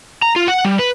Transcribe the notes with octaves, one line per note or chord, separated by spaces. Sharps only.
A#5
F4
F#5
G3
B4